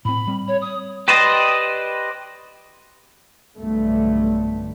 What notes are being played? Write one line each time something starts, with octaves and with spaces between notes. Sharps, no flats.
A2 C4 B5
G3 C4
C#5
D#6
G4 B4 C5 D5 D#5
B1 G2 D3 A3